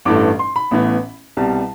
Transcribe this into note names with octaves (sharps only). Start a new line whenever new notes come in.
A1 G2 E3 A3 D6
C6
B5
A1 A2 E3 B3
C2 B2 G3 A5